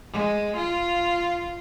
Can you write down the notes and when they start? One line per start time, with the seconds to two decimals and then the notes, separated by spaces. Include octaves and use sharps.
0.12 G#3
0.56 F4